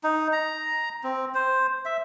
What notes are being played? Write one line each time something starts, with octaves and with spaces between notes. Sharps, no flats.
D#4
A#5
C4
C5
E5